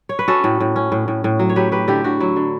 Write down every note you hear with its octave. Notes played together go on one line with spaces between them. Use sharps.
C#5
B4
C#4 F#4 A4
A2
A2
C#4
A2
A2
A2
F#3
C#5
F#3 G4 B4
F#3 G4 B4
D3 E4 G4
D3 F#4
F#3 E4
D3